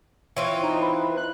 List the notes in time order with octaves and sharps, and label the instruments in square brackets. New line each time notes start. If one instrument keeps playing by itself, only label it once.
[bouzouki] E3 C4 F4 [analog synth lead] C#5
[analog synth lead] D#4
B4
F#6